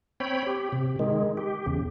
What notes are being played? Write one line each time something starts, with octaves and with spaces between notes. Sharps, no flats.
C4 C#5 G5 B5
G4
C3
D#3 G#3
G4
E2 C#3